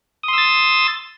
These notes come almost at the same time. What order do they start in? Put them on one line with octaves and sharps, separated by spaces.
D#6 C6 E6 A6